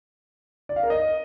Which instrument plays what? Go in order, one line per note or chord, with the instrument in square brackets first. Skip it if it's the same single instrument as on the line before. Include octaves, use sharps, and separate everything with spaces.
[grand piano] D5
F5
A#4
D#5